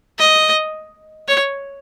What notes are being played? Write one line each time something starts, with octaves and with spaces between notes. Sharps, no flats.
D#5
C#5